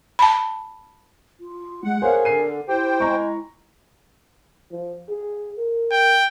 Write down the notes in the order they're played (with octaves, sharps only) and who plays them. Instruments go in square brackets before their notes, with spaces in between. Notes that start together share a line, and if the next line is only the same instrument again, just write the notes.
[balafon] A5 B5
[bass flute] F4
[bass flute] G#3 [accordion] F#5
[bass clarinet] G#4 [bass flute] A#4 [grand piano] C5 C#5 F5
[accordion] D3 [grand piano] C7 D#7
[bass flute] E4 [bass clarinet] G4 [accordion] C5 G5
[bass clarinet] G#3 [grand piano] A#5 C#6
[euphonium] F3
G#4
A#4
[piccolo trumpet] G5